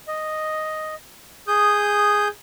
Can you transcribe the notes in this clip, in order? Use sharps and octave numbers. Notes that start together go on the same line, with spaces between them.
D#5
G#4 D#6 G6